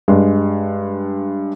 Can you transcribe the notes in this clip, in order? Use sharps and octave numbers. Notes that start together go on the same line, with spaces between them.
G2 G#3